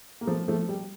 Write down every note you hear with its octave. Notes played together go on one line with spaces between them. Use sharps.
A#3
F3 A3
F3 A3
G3